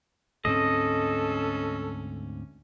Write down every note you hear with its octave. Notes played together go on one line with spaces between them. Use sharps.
D2 G#2 C4 C#4 A4 D#5